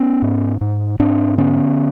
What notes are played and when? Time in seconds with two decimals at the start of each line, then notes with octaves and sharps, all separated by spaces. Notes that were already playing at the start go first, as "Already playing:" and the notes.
Already playing: B3 C#4
0.22 G#2
0.61 G#2
0.99 G#2 C4 D4
1.38 D3 B3 C#4